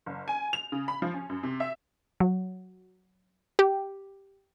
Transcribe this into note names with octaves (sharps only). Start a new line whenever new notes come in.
F#1
G#5
F7
C#3
B5
F3
C#4
F#2
C3
E5
F#3
G4